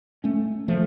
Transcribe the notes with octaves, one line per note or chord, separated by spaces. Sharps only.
A3 C#4
F3 A3